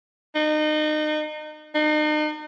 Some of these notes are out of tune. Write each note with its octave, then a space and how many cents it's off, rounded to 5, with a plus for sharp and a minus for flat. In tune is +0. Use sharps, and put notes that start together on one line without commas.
D#4 -30
D#4 -40